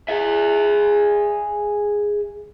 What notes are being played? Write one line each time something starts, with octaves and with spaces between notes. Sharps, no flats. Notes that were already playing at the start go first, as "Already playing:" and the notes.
G#4 E5